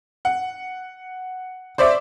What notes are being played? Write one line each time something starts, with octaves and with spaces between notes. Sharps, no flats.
F#5
C5 D5 E5 D6